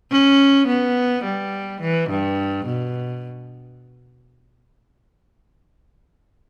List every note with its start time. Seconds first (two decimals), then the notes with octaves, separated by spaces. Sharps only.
0.11 C#4
0.68 B3
1.24 G3
1.81 E3
2.09 G2
2.66 B2